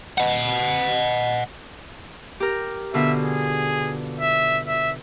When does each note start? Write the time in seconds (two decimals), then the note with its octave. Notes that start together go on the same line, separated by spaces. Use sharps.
0.18 D#5 F#5
2.40 G4 A#4
2.94 B2 D3 F4 E5
3.23 G#4
4.20 E5
4.67 E5